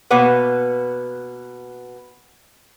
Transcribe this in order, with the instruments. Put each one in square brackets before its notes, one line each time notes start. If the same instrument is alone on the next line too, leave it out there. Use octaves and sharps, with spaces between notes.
[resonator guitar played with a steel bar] B2 A#3 B3 B4 F#5